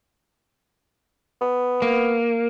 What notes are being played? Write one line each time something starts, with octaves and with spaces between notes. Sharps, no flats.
B3
A#3